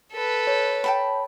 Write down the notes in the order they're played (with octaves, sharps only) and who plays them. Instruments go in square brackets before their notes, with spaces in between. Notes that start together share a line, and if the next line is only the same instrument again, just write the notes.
[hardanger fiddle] A4 B4
[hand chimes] C#5
[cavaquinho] G5 A5 B5